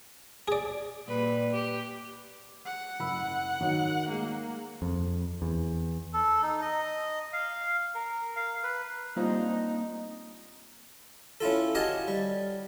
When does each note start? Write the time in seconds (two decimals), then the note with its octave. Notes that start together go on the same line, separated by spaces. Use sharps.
0.48 G#4 D5
1.06 A#2 G3 B4
1.52 G4
2.66 F#5
3.00 F#1 B5 E6
3.61 D#3 F#3
4.10 G#3 A#3
4.82 F2
5.42 E2
6.13 A4
6.43 D#4
6.62 D#5
7.33 F5
7.95 A#4
8.36 F5
8.63 B4
9.16 G3 A#3 C4 D4 D#4 F4 C5
11.41 C#4 E4 F4 A4
11.75 F#4 G4 D#5 F5 G#5 A5
12.08 G3